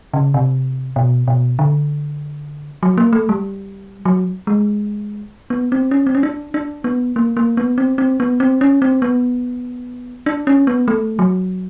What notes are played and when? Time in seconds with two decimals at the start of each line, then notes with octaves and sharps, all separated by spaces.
0.14 C#3
0.34 C3
0.96 B2
1.28 B2
1.59 D3
2.83 F#3
2.98 A#3
3.13 A3
3.29 G3
4.05 F#3
4.47 G#3
5.50 B3
5.72 C4
5.91 C#4
6.07 C4
6.15 C#4
6.23 D4
6.54 D4
6.84 B3
7.16 A#3
7.37 A#3
7.57 B3
7.78 C4
7.98 C4
8.20 B3
8.40 C4
8.61 C#4
8.82 C4
9.02 B3
10.26 D4
10.47 C#4
10.67 B3
10.88 A3
11.19 F#3